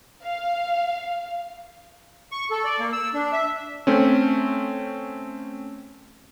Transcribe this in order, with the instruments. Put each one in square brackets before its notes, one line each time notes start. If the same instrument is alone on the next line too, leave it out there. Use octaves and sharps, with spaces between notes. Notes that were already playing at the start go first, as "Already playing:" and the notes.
[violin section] F5
[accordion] C#6
A4
D5
A#3
E6
D4
E5
[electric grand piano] A3 C4 C#4